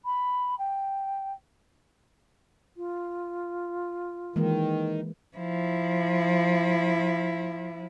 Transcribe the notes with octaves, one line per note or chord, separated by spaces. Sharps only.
B5
G5
F4
D#3 E3 G#3 A#3
F3 E4